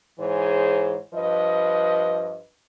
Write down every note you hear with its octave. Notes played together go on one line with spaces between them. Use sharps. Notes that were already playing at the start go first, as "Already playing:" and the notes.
G#2 E3 G#4 C5 C#5
G2 F3 B4 D#5